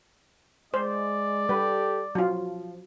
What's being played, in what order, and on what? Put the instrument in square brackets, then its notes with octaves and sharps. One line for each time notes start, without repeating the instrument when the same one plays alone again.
[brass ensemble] G#3 [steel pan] C5 [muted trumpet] D5
[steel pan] G3 B4 [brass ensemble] G4 A4
[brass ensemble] F3 [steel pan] F#3 F4